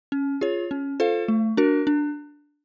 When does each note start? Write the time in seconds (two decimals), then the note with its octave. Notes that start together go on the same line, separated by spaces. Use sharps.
0.12 C#4
0.41 F4 G#4 C#5
0.71 C#4
1.00 F4 A4 C5 F5
1.28 A3
1.57 D4 F#4 A#4
1.87 D4